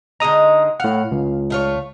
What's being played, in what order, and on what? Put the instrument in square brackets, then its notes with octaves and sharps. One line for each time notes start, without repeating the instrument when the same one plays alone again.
[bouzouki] D3 G#3 D#4 [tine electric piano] A#5 D#6
[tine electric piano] A2 F#5 [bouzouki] F5
[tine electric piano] C#2
[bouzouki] A3 F4 C#5